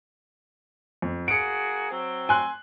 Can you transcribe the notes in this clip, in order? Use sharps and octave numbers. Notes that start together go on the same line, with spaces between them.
F2
A#3 F#4 G#4 C#7 D7
F#3 C4
G#5 C6 F#6